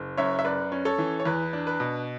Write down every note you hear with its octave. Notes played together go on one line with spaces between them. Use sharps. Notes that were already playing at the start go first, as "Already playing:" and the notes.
Already playing: F#1
F#2 C#5 E5
E5
F#2 B4 D5
C#4
A4 C#5
E3
C#5
E2 B4
D4
B4
B2